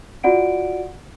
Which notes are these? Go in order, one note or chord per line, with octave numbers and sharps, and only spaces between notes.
F4 F#4 D5 F#5 D7